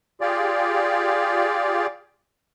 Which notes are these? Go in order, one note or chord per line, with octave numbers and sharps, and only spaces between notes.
F4 G4 G#4 D5